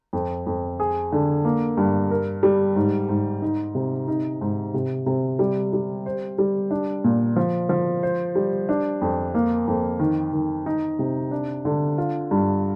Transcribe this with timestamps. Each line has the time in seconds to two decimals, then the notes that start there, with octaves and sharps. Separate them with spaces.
0.13 F2
0.47 F2
0.80 G#4
1.12 D3
1.45 A#3
1.77 G2
2.11 A#4
2.43 G3
2.76 G#2
3.09 G#2
3.42 D#4
3.75 C3
4.08 D#4
4.41 G#2
4.74 C3
5.06 C3
5.39 G3
5.73 G3
6.06 C5
6.38 G3
6.71 D4
7.04 A#2
7.36 F3
7.69 F3
8.03 C5
8.35 G3
8.69 D4
9.02 F2
9.35 A#3
9.68 F2
10.00 D#3
10.33 D#3
10.66 D#4
10.99 C3
11.31 D4
11.65 D3
11.98 F4
12.31 G2